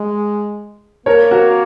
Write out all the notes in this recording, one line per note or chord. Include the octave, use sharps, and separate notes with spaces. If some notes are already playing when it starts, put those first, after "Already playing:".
Already playing: G#3
A#3 A#4 C#5
F#4 A#4